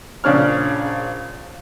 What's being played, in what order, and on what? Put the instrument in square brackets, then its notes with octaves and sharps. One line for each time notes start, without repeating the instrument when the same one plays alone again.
[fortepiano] A#1 C#3 D4 C#5 F6